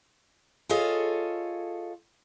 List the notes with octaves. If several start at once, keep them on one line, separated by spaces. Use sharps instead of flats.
F4 G#4 A4 C#5 D#5 F5